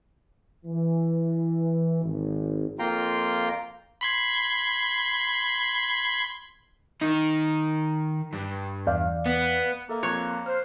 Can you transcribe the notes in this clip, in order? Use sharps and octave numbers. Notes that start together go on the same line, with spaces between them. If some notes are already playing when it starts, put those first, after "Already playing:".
E3
G#1
F2 A#3 F4 G5 A#5 C6
B5 C6 G#6
D#3 D#4
G2
E2 D5 F5
B3
A#3 A4 E5 A#5
F2 C#5 C6 F#6
C5 F6